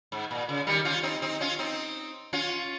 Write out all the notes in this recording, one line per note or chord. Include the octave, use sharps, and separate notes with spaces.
G#2
A#2
C#3
D#3 G3
C#4 F4
C4 D#4
C4 D#4
C#4 F4
C4 D#4
C#4 F4